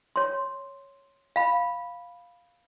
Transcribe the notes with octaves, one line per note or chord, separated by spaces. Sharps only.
C#5 C6
F5 B5